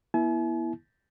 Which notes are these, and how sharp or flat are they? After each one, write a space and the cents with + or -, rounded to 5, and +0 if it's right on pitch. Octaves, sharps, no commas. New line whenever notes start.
B3 -40 E4 +0 G#5 +45